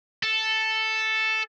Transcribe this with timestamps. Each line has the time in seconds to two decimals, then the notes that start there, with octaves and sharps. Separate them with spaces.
0.23 A4